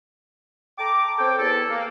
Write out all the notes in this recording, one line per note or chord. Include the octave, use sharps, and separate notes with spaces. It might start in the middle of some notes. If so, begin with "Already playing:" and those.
A4 G5 A#5 D6
C4 A4 C5 C#5 G5
E2 E4 A4
A#3